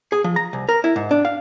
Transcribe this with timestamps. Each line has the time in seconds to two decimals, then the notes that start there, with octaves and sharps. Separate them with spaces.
0.12 G#4
0.24 F3
0.36 A#5
0.53 C2
0.69 A#4
0.84 E4
0.96 G#2
1.11 D4
1.25 F5